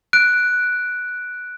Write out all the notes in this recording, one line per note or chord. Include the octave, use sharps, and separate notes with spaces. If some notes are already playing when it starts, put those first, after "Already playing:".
F#6 D7